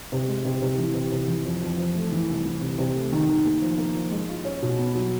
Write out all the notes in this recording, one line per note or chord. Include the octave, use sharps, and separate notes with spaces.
C3
G#3
C3
C3
E3
C3
C3
E3
F2
F2
F3
A3
E3
C2
E3
C3
C3
A3
D#3
D#3
A#3
F3
A#3
F3
G#3
F4
C#4
B2
B3
F#3